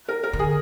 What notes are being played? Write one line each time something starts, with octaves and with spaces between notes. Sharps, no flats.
A#4
A#4
D3
G#4